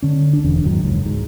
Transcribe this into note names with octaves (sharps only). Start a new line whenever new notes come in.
D3 C#4
D2 D4
E1 E2
E2 G#2 D#3 F#3
F1 C#2
G#2